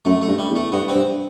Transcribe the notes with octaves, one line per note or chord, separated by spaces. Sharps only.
F#2 A3
A3
G2
G3
E2
A3
G2 B3
C4
G2